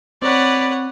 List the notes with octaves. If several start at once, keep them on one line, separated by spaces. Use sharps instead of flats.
C4 B4 C#5 D5 F#5